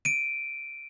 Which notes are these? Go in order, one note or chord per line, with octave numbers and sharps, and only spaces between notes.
D7 D#7